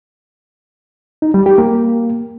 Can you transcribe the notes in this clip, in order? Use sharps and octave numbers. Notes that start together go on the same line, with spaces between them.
D#4
G3
G4
A#3